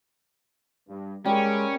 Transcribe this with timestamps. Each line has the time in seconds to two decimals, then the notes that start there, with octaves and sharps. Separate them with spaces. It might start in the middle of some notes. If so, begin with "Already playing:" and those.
0.89 G2
1.25 G3 G#3 A#3 C#4 G5